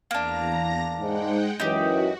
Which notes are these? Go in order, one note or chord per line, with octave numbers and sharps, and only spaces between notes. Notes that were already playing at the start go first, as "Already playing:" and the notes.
E2 A#3 D4 A#5 A#6
G#2 G#3 D#4 F#5 G5
F#2 E3 D#4 F#4 G4